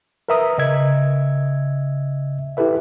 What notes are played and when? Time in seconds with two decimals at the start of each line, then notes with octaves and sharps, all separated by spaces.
0.29 A#4 B4 E5 A#5 D#6
0.58 C#3 D#5 E5 G#6
2.57 E4 G4 A4 B4 E5